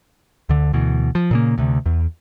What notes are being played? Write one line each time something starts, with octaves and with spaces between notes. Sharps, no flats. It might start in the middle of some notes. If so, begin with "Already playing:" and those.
D2 D3
D2 B2 E3
F3
A#2 C#3 A#3
D2 C3
E2